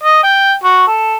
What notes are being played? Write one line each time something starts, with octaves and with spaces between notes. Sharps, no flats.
D#5
G5
F#4
A4